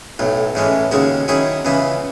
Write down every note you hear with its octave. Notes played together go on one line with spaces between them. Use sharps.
B1 A2 F#3
A1 A2 E3 G#3 C#4
D#2 C#3 G#3 C#4 F#4
D#3 F#3 C#4 E4 G#4
C#2 C#3 E3 B3 E4